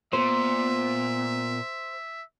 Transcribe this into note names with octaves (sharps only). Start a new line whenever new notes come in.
A#2 B3 C5 E5